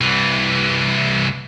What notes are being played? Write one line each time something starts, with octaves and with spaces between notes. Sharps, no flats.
C2 E3